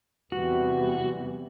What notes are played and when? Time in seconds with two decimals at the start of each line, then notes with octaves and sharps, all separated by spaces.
0.32 E2 C3 E3 G3 B3 F#4